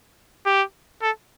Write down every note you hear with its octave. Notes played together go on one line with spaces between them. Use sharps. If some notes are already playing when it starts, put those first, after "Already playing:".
G4
A4